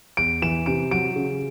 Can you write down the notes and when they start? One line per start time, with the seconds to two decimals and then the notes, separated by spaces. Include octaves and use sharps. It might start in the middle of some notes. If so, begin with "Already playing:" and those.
0.17 E2 D7
0.42 E3 E7
0.66 C3 D7
0.91 F#3 D7
1.16 C#3